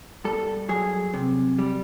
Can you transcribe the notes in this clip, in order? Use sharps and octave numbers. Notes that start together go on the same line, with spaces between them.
G2 A4
F#3 G#4
C3
G3